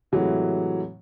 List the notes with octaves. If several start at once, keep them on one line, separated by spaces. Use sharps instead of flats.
A2 C3 E3 F#3 G#3